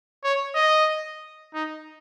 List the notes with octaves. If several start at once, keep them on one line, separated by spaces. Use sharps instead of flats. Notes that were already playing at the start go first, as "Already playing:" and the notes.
C#5
D#5
D#4